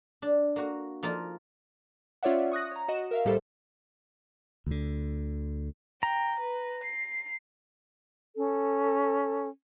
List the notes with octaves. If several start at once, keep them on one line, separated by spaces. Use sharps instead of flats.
D4
A#3 F#4
F3 A#3 D#4 F4
C#4 F4 C#5 D5 E5 F#5
C#6 D#6 F#6 A#6
C#5 A#5
F#4 D#5 E7
A#4 E5 F5
A#1 A2 G3 G4 A4 C5
D2 D3
G5 A#5
B4
C7
C#4 A4